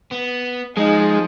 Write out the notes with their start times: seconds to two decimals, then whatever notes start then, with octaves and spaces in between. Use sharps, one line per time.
0.11 B3
0.77 F3 G#3 D#4 G#4